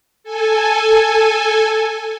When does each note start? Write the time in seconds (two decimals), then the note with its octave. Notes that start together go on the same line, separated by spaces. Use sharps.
0.24 A4 G#5